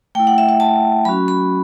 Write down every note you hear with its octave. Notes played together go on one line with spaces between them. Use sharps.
A3 E4 G5
F#5
E5
E5
A5
F#3 C#4 F#4 B5
B5